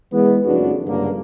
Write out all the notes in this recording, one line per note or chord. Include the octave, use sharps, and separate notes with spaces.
E3 G#3 B3
F#1 F2 A2 D4 F#4
C#2 G2 D3 A#3